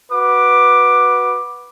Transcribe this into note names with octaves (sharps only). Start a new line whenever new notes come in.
F#4 B4 D6